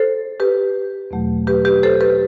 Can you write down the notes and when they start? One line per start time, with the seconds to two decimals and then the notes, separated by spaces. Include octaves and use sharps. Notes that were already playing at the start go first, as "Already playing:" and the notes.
Already playing: A4 C5
0.40 G4 B4
1.11 E2 B2 F#3 A3
1.47 G4 B4
1.65 G4 B4
1.83 A4 C5
2.01 G4 B4